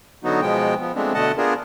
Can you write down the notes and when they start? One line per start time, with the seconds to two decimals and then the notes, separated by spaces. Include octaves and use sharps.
0.24 D3 F#3 B3 D#4 F#4
0.41 B2 F3 G#3 B3 G5
0.80 F3 B3
0.95 F3 G#3 A3 B3 C4 D4
1.14 B2 D3 A3 D#5 F#5 A5
1.37 B3 D4 F4 G#4 A#4